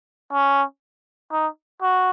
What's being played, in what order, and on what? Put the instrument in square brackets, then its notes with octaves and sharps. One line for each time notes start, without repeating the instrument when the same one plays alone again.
[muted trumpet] C#4
D#4
F#4